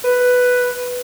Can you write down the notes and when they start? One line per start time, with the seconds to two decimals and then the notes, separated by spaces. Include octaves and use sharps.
0.04 B4